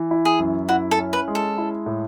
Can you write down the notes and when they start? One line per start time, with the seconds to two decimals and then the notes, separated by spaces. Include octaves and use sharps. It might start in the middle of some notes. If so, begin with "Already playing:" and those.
Already playing: E3
0.11 E4
0.25 G#4
0.39 F#2
0.69 E4 F#4
0.91 A4
0.98 C#4
1.13 B4
1.28 G#3
1.35 A4
1.58 E4
1.86 A2